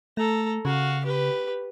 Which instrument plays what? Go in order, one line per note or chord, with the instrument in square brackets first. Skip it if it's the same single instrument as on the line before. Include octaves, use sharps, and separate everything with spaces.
[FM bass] A3 [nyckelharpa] A4 A#5
[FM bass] C#3 [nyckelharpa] F#4 F5
[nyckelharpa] G4 B4